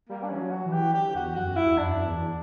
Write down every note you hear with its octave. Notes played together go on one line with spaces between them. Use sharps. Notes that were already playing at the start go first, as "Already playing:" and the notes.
G3 A#3
D4
E3 C#4
F#3
F#4
E3
G4
D3 G4
E2 F#4
F#2 F#4
E4
E2
F#2 D4
F#2
E2